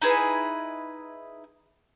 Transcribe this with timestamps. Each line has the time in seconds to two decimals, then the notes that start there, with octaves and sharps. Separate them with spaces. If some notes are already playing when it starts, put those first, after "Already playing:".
0.02 D#4 E4 G#4 B4